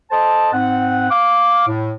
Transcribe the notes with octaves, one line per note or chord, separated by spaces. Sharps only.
A4 C5 D#5 A5
G#2 C4 F#5
F5 D6
A2